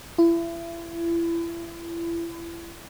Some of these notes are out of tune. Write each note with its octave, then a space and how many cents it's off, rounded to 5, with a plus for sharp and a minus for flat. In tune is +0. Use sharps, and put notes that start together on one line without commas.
E4 +35